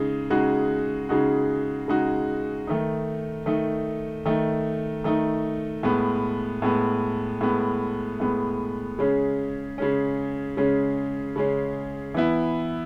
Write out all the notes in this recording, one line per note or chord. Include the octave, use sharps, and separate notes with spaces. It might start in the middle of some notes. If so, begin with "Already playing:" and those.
Already playing: C#3 G#3 D#4
C#3 G#3 D#4 F#4
C#3 G#3 D#4 F#4
C#3 G#3 D#4 F#4
D#3 A3 D#4
D#3 A3 D#4
D#3 A3 D#4
D#3 A3 D#4
A2 G#3 B3
A2 G#3 B3
A2 G#3 B3
A2 G#3 B3
C#3 G#3 C#4
C#3 G#3 C#4
C#3 G#3 C#4
C#3 G#3 C#4
E3 B3 E4